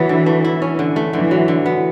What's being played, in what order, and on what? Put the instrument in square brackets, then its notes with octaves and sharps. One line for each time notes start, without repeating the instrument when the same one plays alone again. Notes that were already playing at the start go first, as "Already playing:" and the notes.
Already playing: [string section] E3 [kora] F#3 B3
[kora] D3
A3
E4
C#4
D3
A3
[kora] D3 [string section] E3
[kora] F#3
D3
B3